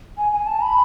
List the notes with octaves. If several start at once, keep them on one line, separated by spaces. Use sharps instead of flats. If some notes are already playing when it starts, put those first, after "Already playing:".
G#5
G#5
A5
B5